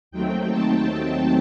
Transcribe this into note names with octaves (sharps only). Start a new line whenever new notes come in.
D#2 D#3 F#3 A3 C4 G5
A5